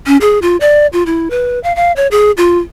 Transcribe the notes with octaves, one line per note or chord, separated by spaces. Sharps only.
C#4
G#4
F4
D5
F4
E4
B4
F5
F5
C#5
G#4
F4